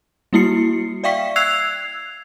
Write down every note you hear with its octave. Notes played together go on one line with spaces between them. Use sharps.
G3 A#3 E4 F#4 C7 C#7
D5 E5 F5 G5 C#6 B6
E6 F#6 G#6 C7 F7